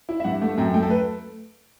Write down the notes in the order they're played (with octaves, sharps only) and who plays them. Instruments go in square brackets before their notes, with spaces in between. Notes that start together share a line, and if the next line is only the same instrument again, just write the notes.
[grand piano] E4
E5
G2 F#5
A3
F#2 G5
A3 G5
A4
B4